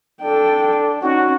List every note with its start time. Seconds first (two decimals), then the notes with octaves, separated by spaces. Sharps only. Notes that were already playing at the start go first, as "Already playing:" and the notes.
0.21 D4 A4 G5
1.02 C#4 D#4 F#4